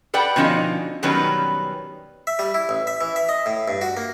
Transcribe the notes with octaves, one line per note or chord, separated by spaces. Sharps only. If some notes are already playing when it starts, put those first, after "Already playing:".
A4 B4 D5 F#5 G5
B2 D3 F3 C#4 D#4
B2 D#3 F#3 G3 C#4 B4
E5
G3
E4
A1
E5
E3
E5
D#5
A2
G2
F#4
A#3